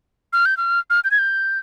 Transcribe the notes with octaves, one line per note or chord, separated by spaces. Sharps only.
F6
G6
F6
F6
G6
G#6
G6